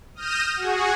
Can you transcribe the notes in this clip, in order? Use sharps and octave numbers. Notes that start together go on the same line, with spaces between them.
D#6 F6 G6 A#6 D#7 E7
F#4 G#4